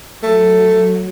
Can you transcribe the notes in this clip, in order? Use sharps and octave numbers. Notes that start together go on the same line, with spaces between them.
F#3 A3